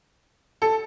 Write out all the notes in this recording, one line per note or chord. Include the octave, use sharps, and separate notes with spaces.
A4